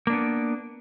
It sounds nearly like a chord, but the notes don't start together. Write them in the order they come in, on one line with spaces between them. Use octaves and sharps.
A#3 D4 B3